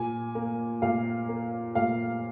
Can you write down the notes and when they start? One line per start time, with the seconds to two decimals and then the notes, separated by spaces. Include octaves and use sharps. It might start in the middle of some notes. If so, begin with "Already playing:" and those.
Already playing: A#2 G#5
0.35 A#3
0.82 A#2 F5
1.29 A#3
1.75 A#2 F5